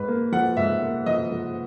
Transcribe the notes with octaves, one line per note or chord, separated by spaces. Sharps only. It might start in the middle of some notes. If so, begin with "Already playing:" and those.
Already playing: G#2 B4
A#3
F3 F#5
G#2 E5
A#3
F3 D#5
F3